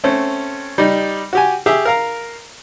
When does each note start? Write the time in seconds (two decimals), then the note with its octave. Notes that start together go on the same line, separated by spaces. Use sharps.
0.04 A3 C4 C#4
0.78 G3 D#4
1.33 F#4 G4 G#5
1.66 G4 G#4 E5
1.85 A#4 F5 A#5